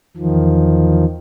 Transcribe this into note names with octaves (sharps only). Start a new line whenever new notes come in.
E2 D#3 F3